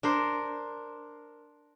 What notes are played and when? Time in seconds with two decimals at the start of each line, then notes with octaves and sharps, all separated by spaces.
0.03 D4 A#4 C5